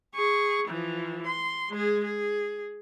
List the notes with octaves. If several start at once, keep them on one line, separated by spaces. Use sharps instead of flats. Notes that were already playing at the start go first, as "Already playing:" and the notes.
G#4 C#6
E3 F3
C6
G#3 G#4
G#4